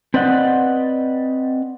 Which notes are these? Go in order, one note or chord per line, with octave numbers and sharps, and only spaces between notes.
C4 B4 D5 D#5 F#5